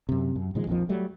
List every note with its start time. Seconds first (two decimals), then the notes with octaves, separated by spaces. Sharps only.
0.09 F#2 C3
0.36 F#2
0.55 A#2 D#3 F3 G#3
0.67 A#1 F2 D#3 F3
0.89 F#3 G3 A3